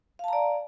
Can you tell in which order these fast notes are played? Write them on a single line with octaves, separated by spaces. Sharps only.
F5 A5 A#5 D5